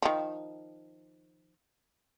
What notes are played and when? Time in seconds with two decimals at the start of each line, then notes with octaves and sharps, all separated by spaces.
0.02 D#3 F3